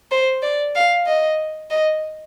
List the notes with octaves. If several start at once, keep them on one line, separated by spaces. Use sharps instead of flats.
C5
D5
F5
D#5
D#5